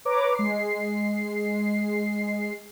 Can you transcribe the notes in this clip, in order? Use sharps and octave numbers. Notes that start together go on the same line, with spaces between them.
B4 C#5 A#5 D6
G#3 C7